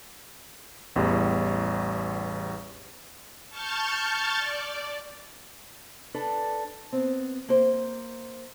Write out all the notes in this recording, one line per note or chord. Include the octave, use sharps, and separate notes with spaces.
A1 E2 G3
A5 C#6 F6 G6 A6
D5
D4 A4 B4
B3 C4
A#3 C5